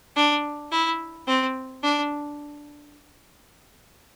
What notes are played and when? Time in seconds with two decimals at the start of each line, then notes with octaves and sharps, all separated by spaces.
0.16 D4
0.72 E4
1.27 C4
1.83 D4